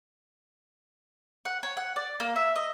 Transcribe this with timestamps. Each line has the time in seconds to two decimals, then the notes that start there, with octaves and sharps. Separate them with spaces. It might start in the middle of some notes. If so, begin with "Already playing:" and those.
1.45 F#5
1.63 C#5
1.77 F#5
1.96 D5
2.20 A#3
2.36 E5
2.56 D#5